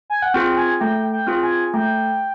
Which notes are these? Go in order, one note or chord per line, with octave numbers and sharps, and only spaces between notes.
G#5
F#5
C4 F4 G#4 G5
G#5
A3 G5
G5
C4 F4 G#4
G#5
A3 G5